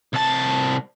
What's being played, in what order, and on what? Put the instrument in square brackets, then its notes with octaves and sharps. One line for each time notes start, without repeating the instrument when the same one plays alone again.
[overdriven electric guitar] C2 A5